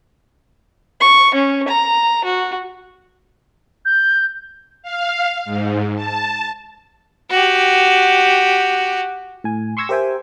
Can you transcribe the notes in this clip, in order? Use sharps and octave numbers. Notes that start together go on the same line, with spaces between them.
C#6
C#4
A#5
F#4
G6
F5
G#2
A5
F#4 G4
A2 G#5
C6 C#6 E6 G#6 A#6
G4 A#4 C5 E5 G5 G#5